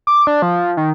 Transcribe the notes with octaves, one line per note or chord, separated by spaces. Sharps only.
D6
D4
F3
D#3